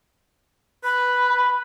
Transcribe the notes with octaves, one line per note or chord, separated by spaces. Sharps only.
B4 B5